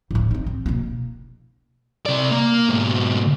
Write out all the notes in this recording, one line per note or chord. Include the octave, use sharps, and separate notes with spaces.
D1 A2
C4 D#4
C4
B2 A#3
C3 D5
A#3
G#2 B2